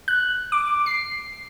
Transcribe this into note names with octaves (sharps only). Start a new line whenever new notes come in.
F#6
D6
C7